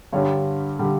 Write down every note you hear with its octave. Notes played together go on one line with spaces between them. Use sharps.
G2 D3 G3 C#5
D3 G3